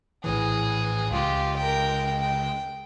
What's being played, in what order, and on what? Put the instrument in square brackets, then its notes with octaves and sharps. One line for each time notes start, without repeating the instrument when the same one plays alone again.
[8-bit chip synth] A#1 A2 E3 [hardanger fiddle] G#4
[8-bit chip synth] C#2 C#3 G#3 [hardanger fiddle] F4 G4
[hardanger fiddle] A#4 G5
G5